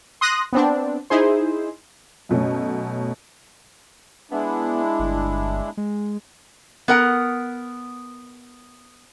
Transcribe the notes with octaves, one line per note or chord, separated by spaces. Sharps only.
C6 D#6 F#6 A#6
B3 C4 D4
D#4 E4 G#4 C5
F#2 B2 A3 C#4
G#3 B3 D4 E4
G1
G#3
B3 A#4 F#5